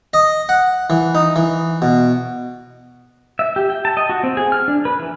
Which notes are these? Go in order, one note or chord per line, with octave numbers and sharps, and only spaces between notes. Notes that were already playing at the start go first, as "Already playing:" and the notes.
D#5
F#5
E3
D#4
E3
B2
E5
G4
G5
A5
D#5
F#4
C4
G#4
F6
D4
B4
E3